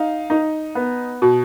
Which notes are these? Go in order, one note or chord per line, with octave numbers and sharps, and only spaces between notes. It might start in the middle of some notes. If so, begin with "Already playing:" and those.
Already playing: D#4 F5
D#4
B3
B2